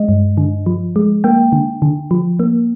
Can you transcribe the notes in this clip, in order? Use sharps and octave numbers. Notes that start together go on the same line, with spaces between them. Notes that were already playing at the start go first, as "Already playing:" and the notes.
Already playing: G#3 D#5
G2
D3
F3
G#3
A#3 G5
D3
D3
F3
A#3